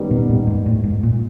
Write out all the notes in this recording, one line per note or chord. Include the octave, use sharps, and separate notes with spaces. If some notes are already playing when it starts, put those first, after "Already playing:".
Already playing: F#2 D#3 G3 B3
B2
A#2
G#2
A2
G#2
A#2